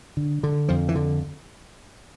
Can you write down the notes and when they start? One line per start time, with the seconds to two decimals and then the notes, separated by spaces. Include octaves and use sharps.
0.17 D3
0.43 D3
0.69 F2 F3
0.89 E3
0.95 D3